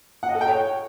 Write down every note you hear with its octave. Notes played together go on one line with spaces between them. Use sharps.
F#5
D#5
A4
G5
C#5